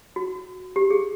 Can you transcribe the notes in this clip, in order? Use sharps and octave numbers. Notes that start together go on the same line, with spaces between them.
F#4
G4
G#4